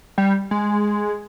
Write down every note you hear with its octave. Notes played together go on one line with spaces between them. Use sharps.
G3
G#3